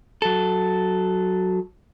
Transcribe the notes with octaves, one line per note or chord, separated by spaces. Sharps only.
F#3 A4